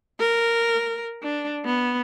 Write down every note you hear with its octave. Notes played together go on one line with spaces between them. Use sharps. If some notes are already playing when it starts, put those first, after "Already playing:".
A#4
D4
B3